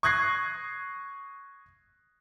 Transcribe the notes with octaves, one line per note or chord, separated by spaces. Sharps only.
C#6 D#6 F#6 G#6 A#6 C7